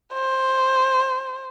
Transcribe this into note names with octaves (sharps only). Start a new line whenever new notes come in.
C5